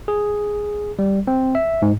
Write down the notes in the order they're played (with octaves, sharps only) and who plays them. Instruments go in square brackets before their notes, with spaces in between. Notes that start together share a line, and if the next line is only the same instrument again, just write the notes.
[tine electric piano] G#4
G3
C4
E5
G#2